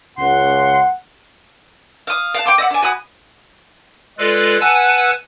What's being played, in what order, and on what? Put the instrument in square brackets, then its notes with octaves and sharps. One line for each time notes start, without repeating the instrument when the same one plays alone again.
[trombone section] C#2 [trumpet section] F#5 [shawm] C6
[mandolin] F5 D#6
F5 F#5 A5
G5 C6 D6
D#5 E5 F#5
D4 G#5
F#4 G#5 B5 D#6
[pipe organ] G#3 F4 A4 B4 D5
B4 F#5 G#5 A5 E6 F#6